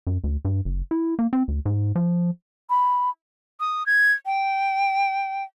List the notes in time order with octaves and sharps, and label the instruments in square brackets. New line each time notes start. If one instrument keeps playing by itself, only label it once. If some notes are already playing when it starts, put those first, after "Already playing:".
[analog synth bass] F#2
D2
G2
F#1
E4
A#3
C4
D2
G#2
F3
[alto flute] B5
[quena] D#6
G#6
G5